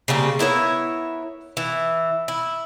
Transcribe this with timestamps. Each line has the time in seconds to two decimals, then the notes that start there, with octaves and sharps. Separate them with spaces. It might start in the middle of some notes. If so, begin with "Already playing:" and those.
0.08 C#3 G3 A#3 C4
0.39 B3 E4 A#4 C#5
1.57 E3
2.28 E4